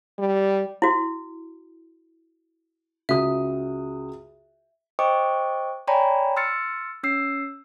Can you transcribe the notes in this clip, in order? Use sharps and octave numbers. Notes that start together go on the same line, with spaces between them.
G3
E4 F#4
C#2 F#4 E5 D#6
C5 D#5 G5 C#6 D6
C#5 D5 G5 G#5 A#5 B5
C6 E6 F6 A6 C#7
C#4 E6 C7